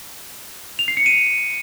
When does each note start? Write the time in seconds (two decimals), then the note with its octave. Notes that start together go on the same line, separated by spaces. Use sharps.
0.79 F7
0.88 C7
0.97 C#7
1.06 D#7